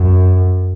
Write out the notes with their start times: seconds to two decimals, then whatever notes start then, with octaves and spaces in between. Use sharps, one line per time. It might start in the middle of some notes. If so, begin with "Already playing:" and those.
Already playing: F#2